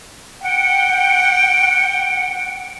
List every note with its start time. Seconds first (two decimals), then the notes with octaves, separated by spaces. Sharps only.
0.40 F#5 G5